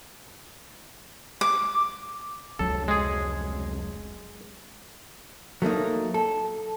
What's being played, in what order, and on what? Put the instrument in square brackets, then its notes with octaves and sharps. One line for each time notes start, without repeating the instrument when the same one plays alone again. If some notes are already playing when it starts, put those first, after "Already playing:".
[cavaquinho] D6
[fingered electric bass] F1 C#2 F#3 [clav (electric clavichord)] A4
[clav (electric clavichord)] G#3 G#4
[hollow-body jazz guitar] F#3 A3 A#3 D#4
A4